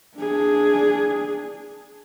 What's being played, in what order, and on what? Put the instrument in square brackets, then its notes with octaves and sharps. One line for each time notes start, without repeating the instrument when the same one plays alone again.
[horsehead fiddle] D4 G#4